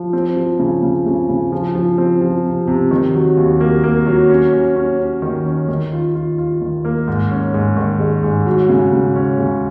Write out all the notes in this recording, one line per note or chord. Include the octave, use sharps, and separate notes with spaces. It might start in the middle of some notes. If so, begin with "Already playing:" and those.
Already playing: F3
C4
F3
C#3
C#3
C#3
C#3
F3
F3
C4
F3
C3
C3
D#3
F#3
D#2
A#3
A#3
F#3
C#4
C#4
C#4
C#4
D#3
C#4
D#3
F4
F4
F4
D#3
A#3
G#2
C#4
G#2
D#3
G#3
G#2
F#3
C#3
C#3
C#4
C#3